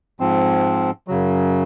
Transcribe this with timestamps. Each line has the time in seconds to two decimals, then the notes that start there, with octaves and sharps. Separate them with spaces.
0.20 G#2 F3 C4
1.08 F#2 C#3 F#3